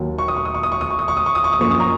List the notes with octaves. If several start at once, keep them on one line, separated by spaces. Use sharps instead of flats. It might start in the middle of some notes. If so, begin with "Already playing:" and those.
Already playing: D#2 D#3 F#3
C#6
D#6
C#6
D#6
C#6
D#6
C#6
D#6
C#6
D#6
C#6
D#6
C#6
D#6
C#6
D#6
F#2 F3 A#3 C#6
D#6
A#5 C#6